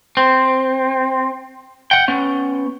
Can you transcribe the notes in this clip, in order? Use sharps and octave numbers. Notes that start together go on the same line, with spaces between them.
C4
F#5 G5
B3 C#4